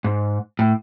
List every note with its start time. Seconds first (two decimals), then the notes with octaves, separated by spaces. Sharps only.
0.04 G#2
0.59 A2